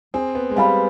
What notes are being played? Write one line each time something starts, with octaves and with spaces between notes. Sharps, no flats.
C4 G#4
B3
G#3
G3 B4 F5 G#5